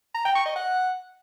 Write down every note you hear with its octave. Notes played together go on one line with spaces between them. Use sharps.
A#5
G5
C#6
D#5
F#5